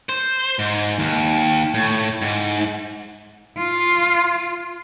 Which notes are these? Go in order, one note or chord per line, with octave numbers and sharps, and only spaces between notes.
C5
G#2
D#2
A2
G#2
F4